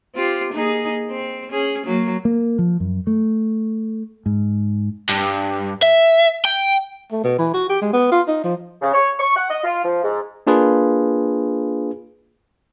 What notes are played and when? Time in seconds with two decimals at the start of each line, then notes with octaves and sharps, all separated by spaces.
0.15 C4 F4 G4
0.53 A#3 D#4 G#4
1.10 C4
1.51 C#4 G#4
1.85 F#3 A#3
2.25 A#3
2.59 F3
2.80 F#2
3.07 A3
4.26 G#2
5.09 G2
5.82 E5
6.45 G5
7.12 A3
7.24 B2
7.38 E3
7.54 F#4
7.69 G4
7.81 G#3
7.93 B3
8.12 F4
8.28 D#4
8.44 F3
8.82 C#3
8.94 C#5
9.19 C#6
9.36 F#5
9.50 D#5
9.64 F4
9.84 F3
10.03 G#2
10.47 A#3 D4 F4 G#4 B4